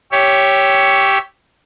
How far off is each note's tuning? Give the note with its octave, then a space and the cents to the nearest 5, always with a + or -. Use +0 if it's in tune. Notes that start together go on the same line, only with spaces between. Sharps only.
G4 +0 C#5 +10 E5 +0